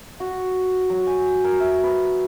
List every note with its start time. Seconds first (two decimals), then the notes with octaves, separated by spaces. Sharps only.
0.20 F#4
0.90 F#3
1.07 G#5
1.44 A#4
1.60 E5
1.83 B4